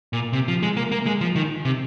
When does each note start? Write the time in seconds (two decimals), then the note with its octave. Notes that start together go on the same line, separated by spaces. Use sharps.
0.13 A#2
0.33 C3
0.48 F3
0.63 G#3
0.77 A#3
0.92 A#3
1.06 G#3
1.21 F3
1.36 D#3
1.65 C3